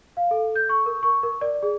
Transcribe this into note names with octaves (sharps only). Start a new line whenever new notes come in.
F5
A4
G6
C#6
A#4
C#6
A#4
D5
G#4